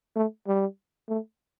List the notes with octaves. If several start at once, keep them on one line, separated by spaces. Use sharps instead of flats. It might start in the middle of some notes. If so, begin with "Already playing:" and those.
A3
G3
A3